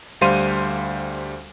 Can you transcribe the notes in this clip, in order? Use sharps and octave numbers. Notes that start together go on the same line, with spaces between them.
D2 G3 C5 F5 C6 D#7